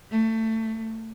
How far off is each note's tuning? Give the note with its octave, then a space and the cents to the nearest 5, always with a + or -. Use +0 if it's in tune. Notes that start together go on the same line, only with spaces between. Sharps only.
A3 +20